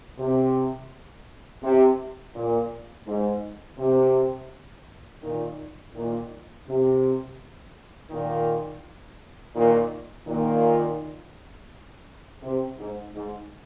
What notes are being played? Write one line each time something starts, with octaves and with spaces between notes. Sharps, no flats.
C3
C3
A#2
G#2
C3
A#2 D#3
A#2 D#3
C3
A#2 D#3
A#2 D#3
A#2 D#3
C3
G#2
G#2